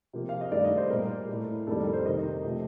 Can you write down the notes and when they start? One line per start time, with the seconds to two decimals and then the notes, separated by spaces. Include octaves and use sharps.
0.13 C3 F3 A#3
0.29 F5
0.41 D#5
0.52 G2 D#3 A3 D5
0.64 D#5
0.77 C5
0.90 A#2 G3 A#3 A#4
1.29 A2 A3
1.67 F2 D#3 G3 A#3 A4
1.80 A#4
1.93 C5
2.05 C3 D#3 A#3 D#5
2.44 C3 F3 A3